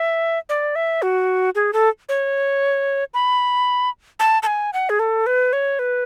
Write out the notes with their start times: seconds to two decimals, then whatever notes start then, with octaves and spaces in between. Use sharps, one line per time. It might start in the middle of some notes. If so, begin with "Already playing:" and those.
Already playing: E5
0.49 D5
0.76 E5
1.02 F#4
1.55 G#4
1.73 A4
2.09 C#5
3.14 B5
4.19 A5
4.43 A5
4.47 G#5
4.73 F#5
4.89 G#4
4.99 A4
5.26 B4
5.53 C#5
5.79 B4